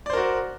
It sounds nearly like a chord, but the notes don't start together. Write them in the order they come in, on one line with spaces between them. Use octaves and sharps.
D5 C5 A#4 F#4